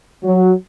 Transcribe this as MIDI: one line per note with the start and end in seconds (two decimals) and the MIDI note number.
0.23 0.52 54